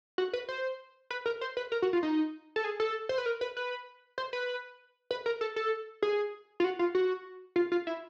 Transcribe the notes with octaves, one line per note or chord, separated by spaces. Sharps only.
F#4
B4
C5
B4
A#4
C5
B4
A#4
F#4
F4
D#4
A4
G#4
A4
C5
B4
A#4
B4
B4
C5
B4
B4
A#4
A4
A4
G#4
F4
F#4
F4
F#4
F4
F4
E4